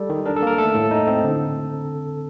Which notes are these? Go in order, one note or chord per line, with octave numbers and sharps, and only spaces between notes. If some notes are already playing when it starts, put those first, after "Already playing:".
Already playing: G3 A4
D#3
D4 A#4
A4
A#3 A#4
A3 A4
A2
D#4
C4
D3